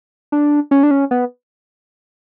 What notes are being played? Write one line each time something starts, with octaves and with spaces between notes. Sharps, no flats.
D4
C#4
D4
C#4
B3